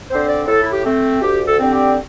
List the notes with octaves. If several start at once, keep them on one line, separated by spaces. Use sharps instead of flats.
D3 C4 C5
D5
A2 A4
E4
G4
A3 C4
D2 G4
A4
D3 G3 C4
G4